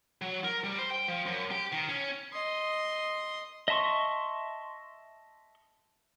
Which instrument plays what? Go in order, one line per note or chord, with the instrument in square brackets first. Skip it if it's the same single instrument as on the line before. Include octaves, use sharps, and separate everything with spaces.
[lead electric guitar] F#3
A#4
G3
C5
G5
F3
F#2
G4
D#3
C#4
[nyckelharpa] D#5 C6
[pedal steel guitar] D#5 E5 A5 C6 C#6